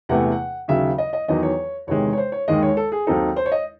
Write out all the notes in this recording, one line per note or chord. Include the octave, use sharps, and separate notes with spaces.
E2 C3 E3 A3 F#5
F#5
D#2 C#3 F#3 E5
D#5
D#5
E2 D#3 F#3 D#5
C#5
E2 C3 D#3 G#3 C#5
C#5
C5
C#5
D#2 D#3 G#3 D#5
C#5
A4
G#4
D#2 D#3 F#3 C4 D#4 A4
C5
C#5
D#5